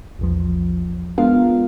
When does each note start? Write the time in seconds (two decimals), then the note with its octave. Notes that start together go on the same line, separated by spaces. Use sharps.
0.19 A#1 E2 F3
1.18 G#3 B3 D4 F4 A#4 F5